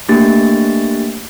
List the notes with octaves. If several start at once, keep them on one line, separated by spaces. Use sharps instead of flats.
A3 A#3 D4 G4 A6